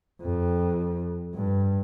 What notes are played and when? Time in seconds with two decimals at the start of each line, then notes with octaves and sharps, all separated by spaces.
0.22 F2
1.35 G2